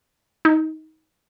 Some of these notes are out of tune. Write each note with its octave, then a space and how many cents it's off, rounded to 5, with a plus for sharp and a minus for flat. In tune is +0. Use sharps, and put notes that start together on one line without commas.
D#4 +25